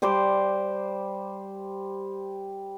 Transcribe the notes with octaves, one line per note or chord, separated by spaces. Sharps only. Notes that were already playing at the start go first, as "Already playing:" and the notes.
G3 C5 C6 D6